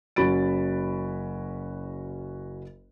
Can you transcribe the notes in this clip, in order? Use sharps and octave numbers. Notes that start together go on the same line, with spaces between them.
F#1 C#4 F#4 B5 A6 D7